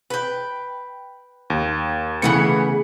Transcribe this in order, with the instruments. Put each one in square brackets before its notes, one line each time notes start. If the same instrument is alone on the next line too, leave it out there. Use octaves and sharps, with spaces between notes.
[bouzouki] B4 G5
[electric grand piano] D#2
[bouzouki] C#3 B3 B4 [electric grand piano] E3 A3 C#7